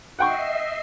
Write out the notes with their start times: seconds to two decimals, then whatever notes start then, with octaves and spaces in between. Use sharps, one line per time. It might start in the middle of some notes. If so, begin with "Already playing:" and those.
0.19 D#5 E5 F#5 G5 C#6 C7